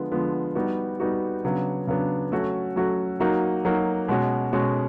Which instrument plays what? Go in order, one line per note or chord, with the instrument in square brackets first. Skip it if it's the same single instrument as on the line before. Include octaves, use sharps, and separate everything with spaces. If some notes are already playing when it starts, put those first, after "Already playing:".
Already playing: [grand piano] D3 F3 G#3 B3
D3 F3 G#3 B3
G3 B3 D#4 F#4
G3 B3 D#4 F#4
C#3 F#3 B3 D4
C#3 F#3 B3 D4
F#3 A3 C#4 F#4
F#3 A3 C#4 F#4
F#3 A#3 D#4 F#4
F#3 A#3 D#4 F#4
B2 G#3 C#4 F#4
B2 G#3 C#4 F#4